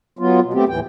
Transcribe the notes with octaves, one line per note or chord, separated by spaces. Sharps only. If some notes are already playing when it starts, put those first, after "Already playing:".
F#3 B3 F4
B2
A3 B3 C4 G4
D#2 A2 E3 G5